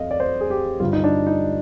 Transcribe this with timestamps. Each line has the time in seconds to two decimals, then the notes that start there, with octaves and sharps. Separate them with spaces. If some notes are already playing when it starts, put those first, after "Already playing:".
Already playing: F2 D#5 F5
0.11 D5
0.20 C5
0.41 G#4
0.50 G4
0.80 G2 D3 G3 F4
0.93 D#4
1.04 D4
1.27 D#4